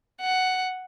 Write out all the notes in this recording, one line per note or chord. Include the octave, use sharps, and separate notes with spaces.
F#5